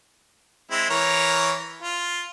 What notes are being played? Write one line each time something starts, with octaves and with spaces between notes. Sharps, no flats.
G#3 C4 E4
E3 A#4 C#5
F4